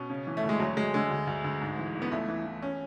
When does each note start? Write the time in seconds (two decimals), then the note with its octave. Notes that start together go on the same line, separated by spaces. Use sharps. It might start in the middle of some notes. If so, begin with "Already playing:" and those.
Already playing: B2 C#4
0.10 C#3
0.27 E3
0.37 A3
0.44 D2
0.49 G#3
0.60 D2 F#3
0.77 D2 G#3
0.94 D3 G#3
1.11 D2
1.27 D2
1.44 D2
1.61 G#2
1.79 E3
1.95 E3
2.02 B3
2.11 C#2 A3
2.28 E3
2.46 E3
2.62 C#4